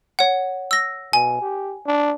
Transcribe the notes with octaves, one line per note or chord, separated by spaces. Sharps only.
C#5 F#5
E6 A#6
B2 G#5
G4
D4